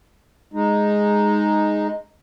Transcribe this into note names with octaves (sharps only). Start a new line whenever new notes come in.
G#3 D#4